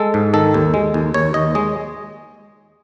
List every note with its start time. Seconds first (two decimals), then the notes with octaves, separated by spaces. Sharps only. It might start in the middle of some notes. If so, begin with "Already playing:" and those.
Already playing: G#3 A4
0.14 G#2
0.34 D#3 A4
0.54 D#2
0.74 G#3
0.94 D#2
1.14 D#2 C#5
1.34 D#2 D#5
1.55 G#3 D#5